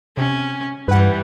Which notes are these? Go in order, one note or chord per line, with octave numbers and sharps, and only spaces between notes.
C3 C#4
G2 E3 G3 B4 F#5